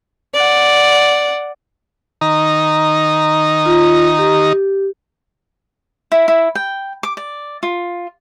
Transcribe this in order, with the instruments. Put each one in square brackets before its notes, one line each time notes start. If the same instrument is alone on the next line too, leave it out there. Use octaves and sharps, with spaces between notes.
[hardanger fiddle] D5 F#5
[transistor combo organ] D#3 D#4 A#5
[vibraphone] F4
G4
[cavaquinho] E4
E4
G5
D6
D5
F4